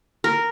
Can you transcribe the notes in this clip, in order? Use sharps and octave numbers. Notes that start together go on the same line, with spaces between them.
A#4